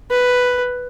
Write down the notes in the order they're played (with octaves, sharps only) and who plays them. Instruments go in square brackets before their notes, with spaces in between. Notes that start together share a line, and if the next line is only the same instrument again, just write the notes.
[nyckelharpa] B4